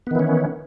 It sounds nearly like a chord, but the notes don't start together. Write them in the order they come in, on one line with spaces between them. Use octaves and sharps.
B3 D#3 E3 C#4